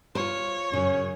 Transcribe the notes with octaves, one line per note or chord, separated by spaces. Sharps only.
F4 C5 C#5
F#2 C#3 C#4